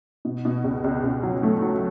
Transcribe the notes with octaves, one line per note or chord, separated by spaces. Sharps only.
B2
B2
C#2
C#2
C#2
F#3
A3
F#3